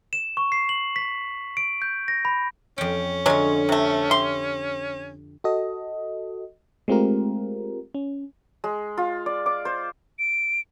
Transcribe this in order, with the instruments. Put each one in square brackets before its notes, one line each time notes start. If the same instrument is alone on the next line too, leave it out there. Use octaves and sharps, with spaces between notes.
[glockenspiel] E7
C#6
C7
F#7
B6
D7
G6
A#6
B5
[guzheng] F2 G5 [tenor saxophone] C#4
[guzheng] D3 F4 [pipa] F#3 G#3 C#5
[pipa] C3 A3
[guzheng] G4 [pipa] C6
[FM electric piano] F#4 A4 D#5
G#3 A3 C4 F4 G4 A#4
C#4
[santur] G#3
F4
D5
D6
C5
[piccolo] D7